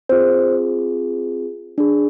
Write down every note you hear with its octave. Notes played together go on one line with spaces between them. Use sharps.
C4 F4 G#4 C5
D4 G#4